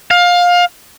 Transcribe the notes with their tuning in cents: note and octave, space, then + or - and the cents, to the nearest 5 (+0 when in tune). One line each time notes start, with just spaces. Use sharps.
F5 +20